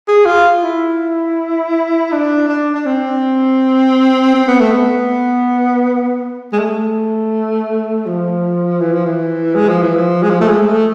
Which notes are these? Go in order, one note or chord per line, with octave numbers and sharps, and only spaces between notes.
G#4
F4
E4
D4
D4
D4
C4
C4
B3
A3
B3
G#3
A3
F3
E3
F3
E3
G#3
F3
E3
F3
G#3
F3
A3
G#3
A3